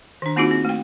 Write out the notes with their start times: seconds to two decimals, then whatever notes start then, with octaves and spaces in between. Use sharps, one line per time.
0.22 D#3 D4
0.36 A#3 C4 D#4 F4 F#4 G#4
0.51 C4
0.65 A3 G5